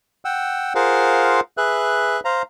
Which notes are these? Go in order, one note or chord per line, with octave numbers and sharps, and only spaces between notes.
F#5 G5 E6
F4 G#4 A#4 C5 F5 F#5
G#4 B4 E5 F#6
C5 F5 A#5